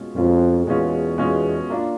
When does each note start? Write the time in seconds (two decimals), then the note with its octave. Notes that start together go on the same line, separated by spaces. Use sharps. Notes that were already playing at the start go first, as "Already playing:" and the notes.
Already playing: B2 G#3 C#4 F4
0.15 F2 B2 G#3 C#4 F4
0.67 E2 B2 G#3 C#4 F4
1.18 B2 G#3 C#4 F4
1.70 A#3 D4 F4